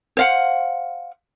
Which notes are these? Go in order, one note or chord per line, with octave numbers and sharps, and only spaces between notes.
C5 F5 F#5